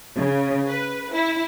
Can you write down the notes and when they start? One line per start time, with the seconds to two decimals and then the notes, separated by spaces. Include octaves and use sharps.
0.17 C#3
0.67 B4
1.14 E4